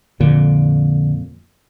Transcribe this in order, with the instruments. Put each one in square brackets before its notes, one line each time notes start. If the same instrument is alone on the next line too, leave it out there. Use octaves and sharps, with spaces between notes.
[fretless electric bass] F2 A#2 [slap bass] D3